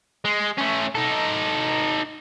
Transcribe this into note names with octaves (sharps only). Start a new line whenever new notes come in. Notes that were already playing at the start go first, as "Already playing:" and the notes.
G#3
A3 C#4
D#4 A4